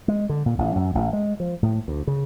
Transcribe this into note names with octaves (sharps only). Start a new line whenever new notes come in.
G#3
D3
A#2
A1
F#2
A1
G#3
F3
A2
D2
C#3